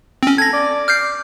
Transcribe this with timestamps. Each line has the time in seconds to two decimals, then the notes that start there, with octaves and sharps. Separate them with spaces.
0.23 C4 C#4
0.38 A4 G#6 A#6
0.53 D5
0.88 F6 G6 C7